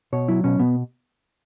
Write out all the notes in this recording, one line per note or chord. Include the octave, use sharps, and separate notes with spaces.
B2 C#5
F#3 E4
B2 C#4
B2 B3